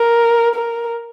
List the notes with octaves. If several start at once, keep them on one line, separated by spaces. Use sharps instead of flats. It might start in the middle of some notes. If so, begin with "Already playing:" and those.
Already playing: A#4
A#4